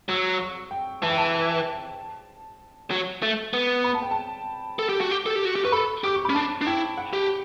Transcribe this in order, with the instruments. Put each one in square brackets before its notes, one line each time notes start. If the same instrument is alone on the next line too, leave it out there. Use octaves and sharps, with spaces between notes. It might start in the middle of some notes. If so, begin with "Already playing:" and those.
[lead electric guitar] F#3 [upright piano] E6
[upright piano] C#6
G5
[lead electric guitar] E3 [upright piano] A5
[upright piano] G5
A5
[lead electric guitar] F#3
A3
B3
[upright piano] B5
A5
G5
A5
[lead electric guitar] A4
G4
F#4
G4
A4
G4
F#4
G4
[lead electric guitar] B4 [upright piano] C#6
[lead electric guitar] A4 [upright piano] B5
[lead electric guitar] G4 [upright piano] D6
[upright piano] C#6
[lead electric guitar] C#4 [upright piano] B5
[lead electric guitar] D4 [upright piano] A5
[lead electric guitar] D4
[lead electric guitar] E4 [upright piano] G5
[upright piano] F#5
[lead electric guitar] G4